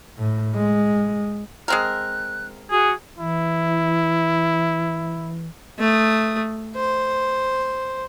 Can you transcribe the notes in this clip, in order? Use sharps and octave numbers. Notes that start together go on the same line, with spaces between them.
A2
G#3
G#3 C4 A#4 F#6
F#4 G#4
E3 E4
A3 D#6
C5